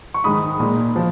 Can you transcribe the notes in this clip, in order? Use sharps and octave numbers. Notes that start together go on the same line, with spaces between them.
C#6
G#2 D#3 G#3 B5 D#6
A#2 G#3
F3